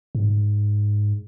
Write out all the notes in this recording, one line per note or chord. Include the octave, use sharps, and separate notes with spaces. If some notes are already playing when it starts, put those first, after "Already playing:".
G#2